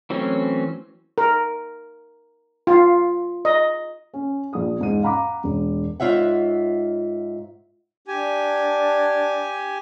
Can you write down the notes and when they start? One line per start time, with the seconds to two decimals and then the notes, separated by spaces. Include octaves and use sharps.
0.10 E3 F#3 A3 C4 C#4
1.18 A#4
2.67 F4
3.45 D#5
4.14 C#4
4.53 A#1 D#6
4.79 E2 G#2 D#7
5.03 F5 F#5 A#5 B5 D6
5.44 E1
6.00 G#2 F4 C#5 E5 F#5
8.08 D4 G4 G#5